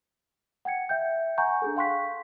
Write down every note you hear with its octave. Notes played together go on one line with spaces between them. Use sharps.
F#5 G5 G#6 C#7
E5 G5 G6
F#5 G#5 A#5 C#6 G6
D4 G#4 A4
F5 G5 C6 C#6 F#6 B6